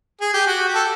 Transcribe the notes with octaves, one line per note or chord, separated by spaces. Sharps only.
G#4
G4
F#4
G4
A4